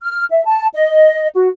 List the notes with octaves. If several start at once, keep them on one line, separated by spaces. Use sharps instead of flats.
F6
E5
A5
D#5
F#4